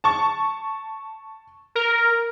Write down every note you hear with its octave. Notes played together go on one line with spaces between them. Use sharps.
A5 C#6
A#4